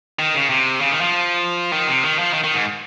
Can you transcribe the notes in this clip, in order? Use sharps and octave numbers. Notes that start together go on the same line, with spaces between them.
D#3
C#3
C3
C#3
D#3
F3
D#3
C3
D#3
F3
D#3
D#3
G#2